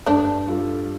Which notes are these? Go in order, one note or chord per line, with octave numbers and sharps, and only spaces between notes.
G2 A3 D4
G3 F4 A4